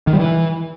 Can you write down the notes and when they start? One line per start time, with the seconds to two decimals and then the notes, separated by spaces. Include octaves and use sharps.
0.07 D#3
0.13 G3
0.19 E3